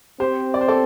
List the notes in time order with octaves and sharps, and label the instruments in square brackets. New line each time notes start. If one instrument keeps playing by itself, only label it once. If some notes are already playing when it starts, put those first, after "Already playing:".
[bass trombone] C4 [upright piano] G4 C5
[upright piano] D5
C5
A4 D5